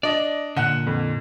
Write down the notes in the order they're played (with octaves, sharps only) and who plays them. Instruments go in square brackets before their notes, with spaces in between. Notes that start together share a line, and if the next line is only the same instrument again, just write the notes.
[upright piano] D4 D#5 [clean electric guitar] D5
[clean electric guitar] A#2 D3 [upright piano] F#5 F#6
[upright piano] F2